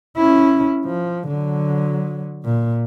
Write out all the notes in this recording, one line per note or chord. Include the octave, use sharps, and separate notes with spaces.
C#4 E4
F3
D3 F#3
A#2